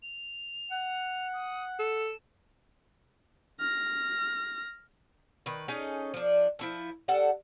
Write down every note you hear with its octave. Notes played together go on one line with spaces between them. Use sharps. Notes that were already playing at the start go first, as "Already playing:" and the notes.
F7
F#5
D#6
A4 E7
F6 A#6
D#3 B4
C#4 D#4 G#4 A4
F3 D4
F3 E4 A4
G3 A4 F#5 A5